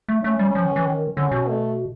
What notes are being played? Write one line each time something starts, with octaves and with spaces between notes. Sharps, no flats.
A3
A3 C#4
G3
F3
D#3
E3
D#3
D3 C#4
B2
A3